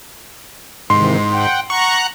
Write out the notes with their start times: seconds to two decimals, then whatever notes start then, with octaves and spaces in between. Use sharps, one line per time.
0.90 G#2 C3 D#3 E3 C6
1.32 F#5 G5
1.70 F#5 A#5 C#6 F#6